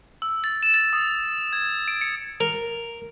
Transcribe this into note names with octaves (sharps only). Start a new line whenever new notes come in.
E6
A6
E7
A6
D#6
G#6
D7
C#7
A#4